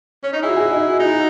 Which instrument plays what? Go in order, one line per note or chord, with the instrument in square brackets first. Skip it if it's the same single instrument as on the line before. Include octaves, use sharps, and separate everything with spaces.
[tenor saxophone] C#4
D#4
[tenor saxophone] E4 [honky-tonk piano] G#4
[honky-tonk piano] F#4
G#4
D#4
[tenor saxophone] D#4 [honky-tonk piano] F#4